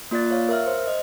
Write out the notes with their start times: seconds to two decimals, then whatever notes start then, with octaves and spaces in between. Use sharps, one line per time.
0.11 A#3 F4 D5 F#6 A6
0.31 C#5 F5
0.49 A#4 E5 F6
0.66 C5
0.87 D#5